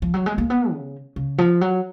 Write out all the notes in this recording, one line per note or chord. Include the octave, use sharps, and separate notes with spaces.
F3
F#3
G#3
A#3
B3
C#3
C#3
F3
F#3